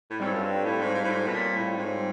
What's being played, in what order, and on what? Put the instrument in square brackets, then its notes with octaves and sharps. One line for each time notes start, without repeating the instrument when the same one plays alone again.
[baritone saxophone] A2
[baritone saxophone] G#2 [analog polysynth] G3 C4 F4 A4 C#5
[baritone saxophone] F#2
G2
A2
G#2
G#2
A2
G#2
B2
A#2
A2
G#2